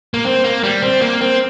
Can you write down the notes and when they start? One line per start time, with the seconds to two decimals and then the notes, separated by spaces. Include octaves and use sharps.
0.14 A#3
0.25 C4
0.44 A#3
0.64 G3
0.82 C4
1.01 A#3
1.21 C4